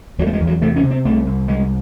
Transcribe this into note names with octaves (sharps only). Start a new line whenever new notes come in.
E2 F#3
A3
G#3
E2
F#3
C3 A3
C#4
C3
C4
C2 A3
C2
C2 G#3